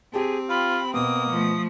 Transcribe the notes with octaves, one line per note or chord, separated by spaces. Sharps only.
C4 G4 G#4 A5
F4 B5
B2 A#3 B3 D#6
F3 A3